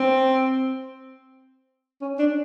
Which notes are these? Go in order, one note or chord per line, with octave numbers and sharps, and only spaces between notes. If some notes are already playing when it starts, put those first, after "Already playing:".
Already playing: C4
C#4
D4